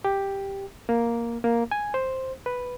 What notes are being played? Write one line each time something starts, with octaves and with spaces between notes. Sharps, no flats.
G4
A#3
A#3
G#5
C5
B4